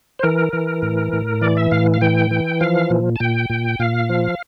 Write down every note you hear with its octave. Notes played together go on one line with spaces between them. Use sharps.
C5
E3 A#4
E3
A2
A2
E3 D5
E5
A2 F5
F5
E3 G5
E3
F3 F5
A#2
A5
A#2 G5
A#2
A#2 F5
F3